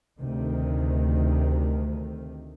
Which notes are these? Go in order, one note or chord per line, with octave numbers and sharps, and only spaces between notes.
D2 C3 D#3